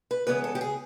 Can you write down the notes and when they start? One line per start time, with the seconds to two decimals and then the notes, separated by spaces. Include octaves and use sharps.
0.11 B4
0.27 C#3 E3 G#3 B3 B4
0.44 A4
0.55 G4
0.61 G#4